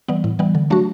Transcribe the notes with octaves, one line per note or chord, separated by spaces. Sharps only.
E3 G3 B3
A2
E3 G3 B3
D3
F#3 A3 D4 F#4